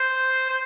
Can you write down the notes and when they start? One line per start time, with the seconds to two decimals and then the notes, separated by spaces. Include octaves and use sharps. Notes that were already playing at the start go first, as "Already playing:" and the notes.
Already playing: C5
0.50 C5